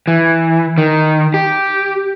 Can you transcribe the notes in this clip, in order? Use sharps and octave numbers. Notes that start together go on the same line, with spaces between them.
E3
D#3
G4